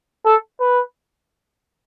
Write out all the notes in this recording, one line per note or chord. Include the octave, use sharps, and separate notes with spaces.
A4
B4